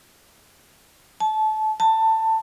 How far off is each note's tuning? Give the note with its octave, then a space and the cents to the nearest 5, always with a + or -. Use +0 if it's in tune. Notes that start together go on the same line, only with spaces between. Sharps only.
A5 -25
A5 +15